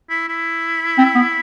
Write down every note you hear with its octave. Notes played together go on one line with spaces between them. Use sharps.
E4
E4
C4
B3